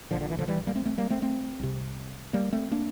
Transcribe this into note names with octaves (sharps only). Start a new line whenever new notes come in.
A#1 A#2 D3 F3
D3
E3
D3 F3
E3 G3
G3 A#3
A3 C4
A3 C4
G3 A#3
A3 C4
A3 C4
C2 C3
G3 A#3
A3 C4
A#3 D4